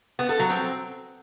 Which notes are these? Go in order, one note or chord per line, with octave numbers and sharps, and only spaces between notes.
B3
A4
F#3
C4